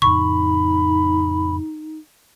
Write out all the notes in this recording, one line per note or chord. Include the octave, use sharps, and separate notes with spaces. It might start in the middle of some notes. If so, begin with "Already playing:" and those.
F2 A2 C#3 D#4 B5 C#6